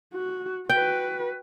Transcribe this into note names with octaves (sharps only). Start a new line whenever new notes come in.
F#4
F#4 B4 G5